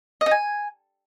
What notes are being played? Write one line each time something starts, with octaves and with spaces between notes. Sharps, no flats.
D#5
D#4
G#5